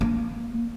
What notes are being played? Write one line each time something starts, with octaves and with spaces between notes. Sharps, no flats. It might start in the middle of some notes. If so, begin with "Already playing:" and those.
A#3